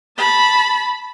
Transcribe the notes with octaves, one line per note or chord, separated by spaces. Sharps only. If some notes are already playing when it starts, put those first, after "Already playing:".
A5 B5